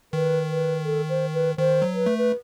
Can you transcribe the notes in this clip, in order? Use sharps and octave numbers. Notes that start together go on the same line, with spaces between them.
D#3 B4
B4
A4
C5
B4
D#3 C5
F#3
B4
A3
B4